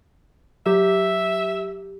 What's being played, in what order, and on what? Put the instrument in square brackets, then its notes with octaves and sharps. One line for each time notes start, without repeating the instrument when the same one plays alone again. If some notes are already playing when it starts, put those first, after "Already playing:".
[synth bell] F#3 G4 [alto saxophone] E5